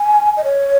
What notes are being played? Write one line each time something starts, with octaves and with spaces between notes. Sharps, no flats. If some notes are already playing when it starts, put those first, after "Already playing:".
Already playing: G#5
D#5
C#5